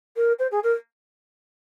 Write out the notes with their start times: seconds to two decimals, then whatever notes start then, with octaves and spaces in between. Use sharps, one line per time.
0.16 A#4
0.39 C5
0.51 G#4
0.63 A#4